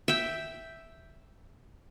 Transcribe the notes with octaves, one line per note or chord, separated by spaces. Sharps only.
E5 G5